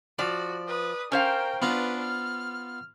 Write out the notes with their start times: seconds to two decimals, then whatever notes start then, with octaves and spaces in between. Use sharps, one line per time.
0.19 F3 F#4 D5
0.68 B4 D#6
1.12 C#4 A#4 C5 F5 G5
1.62 B3 D4 F4 B4 A#5
2.02 F6